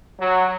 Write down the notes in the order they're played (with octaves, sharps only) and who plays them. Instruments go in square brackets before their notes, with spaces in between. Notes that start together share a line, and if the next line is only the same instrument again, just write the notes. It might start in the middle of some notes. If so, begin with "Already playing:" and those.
[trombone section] F#3